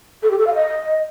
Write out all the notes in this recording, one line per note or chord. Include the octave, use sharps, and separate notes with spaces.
A4
G4
A4
F5
D#5